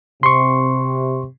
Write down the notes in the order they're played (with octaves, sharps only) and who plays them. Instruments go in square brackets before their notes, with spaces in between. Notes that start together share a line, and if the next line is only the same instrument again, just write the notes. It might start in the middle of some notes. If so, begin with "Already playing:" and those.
[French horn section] C3 [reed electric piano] C6 C#6